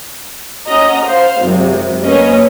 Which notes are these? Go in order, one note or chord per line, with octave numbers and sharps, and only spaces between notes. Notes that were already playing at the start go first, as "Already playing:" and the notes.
C#4 F#4 D#5 A#5
C5 F5
G#1 F#2 C3
A#3 C#4 B4 C#5 D#5